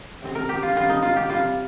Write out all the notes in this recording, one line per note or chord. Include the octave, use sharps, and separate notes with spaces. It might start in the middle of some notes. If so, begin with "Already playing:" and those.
C3 D#3 C4
A#4
G4
F4
D#3 G3 C4 F4
D#4
F4
G4
C3 G3 C4 F4